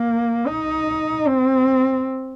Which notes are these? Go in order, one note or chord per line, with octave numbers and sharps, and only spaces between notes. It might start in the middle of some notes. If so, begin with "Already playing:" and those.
Already playing: A#3
D#4
C4